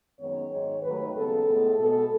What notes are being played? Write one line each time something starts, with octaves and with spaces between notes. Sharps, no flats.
F#2 D#3 G#3 B3 C#5
G#2 D#3 G#3
D#2 D#3 F#3 A3 B4
D#2 C#3 G#3 B3 A4
A2 G#3 B3
B2 G#3 B3 A4